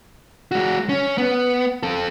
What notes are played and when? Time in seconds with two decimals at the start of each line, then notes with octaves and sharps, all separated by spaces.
0.51 G#3 F#4
0.89 C#4
1.18 B3
1.83 C4 A4